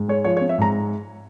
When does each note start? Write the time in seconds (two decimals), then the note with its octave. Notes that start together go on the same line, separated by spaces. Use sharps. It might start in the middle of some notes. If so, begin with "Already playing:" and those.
Already playing: G#2
0.08 G#3 C#5
0.24 F3 C#5
0.37 C#5
0.41 C4
0.49 E5
0.58 G#2 A#5